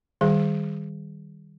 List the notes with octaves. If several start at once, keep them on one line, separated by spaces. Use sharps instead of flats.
D#3 G3 G#4